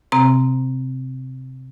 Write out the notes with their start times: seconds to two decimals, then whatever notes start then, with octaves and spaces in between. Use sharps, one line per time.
0.12 C3 C4 A#5